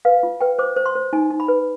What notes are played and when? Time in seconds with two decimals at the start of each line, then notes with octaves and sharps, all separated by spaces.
0.05 B4 F5
0.23 F4
0.41 B4 G5
0.59 C5 D6
0.76 C5
0.86 C6
0.95 C5
1.13 D#4 G#5
1.30 D#4
1.40 B5
1.48 B4